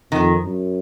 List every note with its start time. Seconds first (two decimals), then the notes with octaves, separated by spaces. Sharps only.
0.12 F2 D#3
0.44 F#2